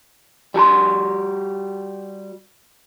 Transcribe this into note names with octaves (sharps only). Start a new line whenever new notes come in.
G3 F#4 A#5 C6